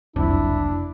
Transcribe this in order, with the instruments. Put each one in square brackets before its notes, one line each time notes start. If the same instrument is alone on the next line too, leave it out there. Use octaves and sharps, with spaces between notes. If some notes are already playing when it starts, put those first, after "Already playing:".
[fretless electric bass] F#1 C2 [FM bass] F2 [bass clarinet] D4 [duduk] E4